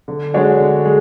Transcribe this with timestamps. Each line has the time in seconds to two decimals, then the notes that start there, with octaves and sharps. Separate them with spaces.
0.08 D3
0.34 G#3 D4 F#4 C#5
0.60 D3
0.85 G#3